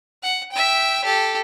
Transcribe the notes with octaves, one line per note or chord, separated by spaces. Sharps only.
F#5
E5 G5
G4 A4